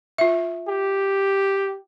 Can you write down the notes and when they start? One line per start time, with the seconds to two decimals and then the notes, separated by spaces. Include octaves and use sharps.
0.18 F4 E5
0.68 G4